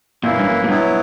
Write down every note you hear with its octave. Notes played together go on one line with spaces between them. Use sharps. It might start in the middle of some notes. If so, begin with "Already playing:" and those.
F#2 A#2 E3 A#3 E4
G2
A#2
G2 B2 F#3 B3 E4